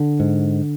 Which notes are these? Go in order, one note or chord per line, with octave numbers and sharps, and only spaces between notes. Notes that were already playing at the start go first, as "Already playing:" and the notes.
Already playing: D3
G#2